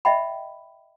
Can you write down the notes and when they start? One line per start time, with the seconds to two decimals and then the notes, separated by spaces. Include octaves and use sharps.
0.05 D#5 E5 G5 B5